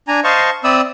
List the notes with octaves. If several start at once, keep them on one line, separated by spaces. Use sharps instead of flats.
D4 G#5 A#5
C5 D#5 F5 A5 C#6
C4 D5 E5 B5 D#6 E6